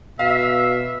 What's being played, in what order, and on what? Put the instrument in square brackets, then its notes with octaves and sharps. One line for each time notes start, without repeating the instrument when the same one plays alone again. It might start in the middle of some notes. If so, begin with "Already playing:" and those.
[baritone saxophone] B2 [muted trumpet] E5 [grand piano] F5